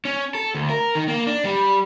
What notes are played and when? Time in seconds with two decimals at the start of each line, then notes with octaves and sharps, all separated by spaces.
0.05 C#4
0.35 A4
0.55 D2
0.70 A#4
0.95 D#3
1.08 A#3
1.27 D4
1.45 G3